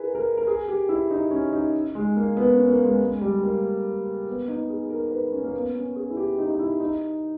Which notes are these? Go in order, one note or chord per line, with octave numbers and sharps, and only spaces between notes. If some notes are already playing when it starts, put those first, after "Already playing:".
Already playing: E4 G#4 A#4 B4
A#4
A#4
G#4
G4
E4
D#4
C#4
D#4
G#3
A#3
B3
C#4
A#3
G#3
G#3
G3
A#3
B3
D#4
G#4
A#4
B4
C#4
A#3
B3
C#4
G#4
E4
G4
D#4
D#4
E4
D#4